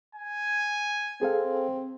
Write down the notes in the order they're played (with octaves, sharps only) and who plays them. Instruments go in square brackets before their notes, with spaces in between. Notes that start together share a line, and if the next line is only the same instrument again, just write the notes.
[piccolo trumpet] G#5
[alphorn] C4 [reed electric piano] G#4 A4 F5